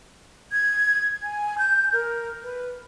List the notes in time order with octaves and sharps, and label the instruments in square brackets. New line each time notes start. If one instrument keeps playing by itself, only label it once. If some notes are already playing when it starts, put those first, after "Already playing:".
[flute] G#6
G#5
G6
A#4
B4